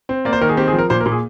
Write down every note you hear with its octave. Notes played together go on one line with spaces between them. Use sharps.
C4
A#3 D5
C5
D#3 A#4
G#4
C4 G4
G#4
F3
A#4
A#2 C5
A#4
A#2
G#4